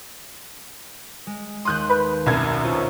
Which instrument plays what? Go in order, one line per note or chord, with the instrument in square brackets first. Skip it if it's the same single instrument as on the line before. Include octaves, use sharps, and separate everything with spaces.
[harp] G#3
[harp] D#2 D#6 [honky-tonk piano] C6 F#6 G6
[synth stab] B4
[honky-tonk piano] C2 F#2 G#6 [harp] B2
[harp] C#4 F4 C5